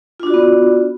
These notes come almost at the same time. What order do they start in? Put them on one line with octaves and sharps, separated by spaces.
F4 D4 F#4 D5 B3